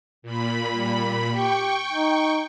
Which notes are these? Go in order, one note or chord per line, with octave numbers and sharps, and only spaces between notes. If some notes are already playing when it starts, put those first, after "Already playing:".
A#2 B5
G3
G4 G5 C#6
D#4